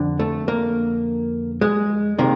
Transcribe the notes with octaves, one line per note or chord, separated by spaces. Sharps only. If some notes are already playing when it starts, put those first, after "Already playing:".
Already playing: F2 D3
A3
A#3
G#3
C3 D#3 A#3